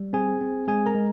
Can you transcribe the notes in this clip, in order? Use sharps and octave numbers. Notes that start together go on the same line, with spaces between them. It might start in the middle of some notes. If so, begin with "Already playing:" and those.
Already playing: G3
C4 G#4 G#5
C4
G#3 G#4 G#5
A#4 A#5
G#3